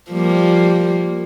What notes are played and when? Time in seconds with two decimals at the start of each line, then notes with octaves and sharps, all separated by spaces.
0.11 F3 G3 A#3